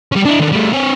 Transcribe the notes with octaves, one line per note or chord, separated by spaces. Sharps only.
G3 C#4
D4 E4
D#3 D4
G3 A3
C4 C#5